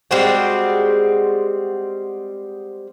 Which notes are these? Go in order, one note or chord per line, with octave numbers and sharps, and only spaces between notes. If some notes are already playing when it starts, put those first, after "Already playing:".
G3 G#3 C4 F#4